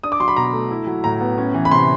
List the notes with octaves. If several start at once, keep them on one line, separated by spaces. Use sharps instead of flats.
D4 D#6
D6
F#3 C6
B5
B2 A#5
A3
E4
F#3
A2 A#5
B3
C#4
E3
B5
C3 C6